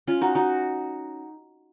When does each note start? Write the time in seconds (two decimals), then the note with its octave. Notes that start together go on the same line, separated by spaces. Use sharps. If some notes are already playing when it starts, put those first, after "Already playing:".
0.07 C#4 F4
0.21 D#4 F#4
0.35 D#4 F#4